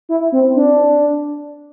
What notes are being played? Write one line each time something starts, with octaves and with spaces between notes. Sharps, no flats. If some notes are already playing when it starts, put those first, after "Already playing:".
E4
C4
D4